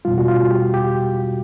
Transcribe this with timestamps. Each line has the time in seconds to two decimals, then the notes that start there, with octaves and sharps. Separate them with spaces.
0.05 E2 B2 G3 F4
0.18 F#4
0.28 F4
0.51 G4
0.74 G4